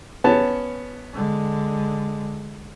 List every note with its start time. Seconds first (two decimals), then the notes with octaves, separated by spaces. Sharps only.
0.24 B3 C#4 A5
1.13 D3 G#3